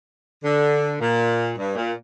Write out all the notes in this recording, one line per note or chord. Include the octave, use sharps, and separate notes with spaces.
D3
A#2
G2
A#2